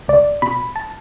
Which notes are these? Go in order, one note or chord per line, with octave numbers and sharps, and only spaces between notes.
C#2 D5
B2 B5
A5